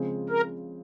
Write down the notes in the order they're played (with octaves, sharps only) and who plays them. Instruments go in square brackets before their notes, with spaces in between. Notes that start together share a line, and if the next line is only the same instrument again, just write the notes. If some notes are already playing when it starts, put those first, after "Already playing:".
Already playing: [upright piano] C#3 F3 G#3 C4
[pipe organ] A#4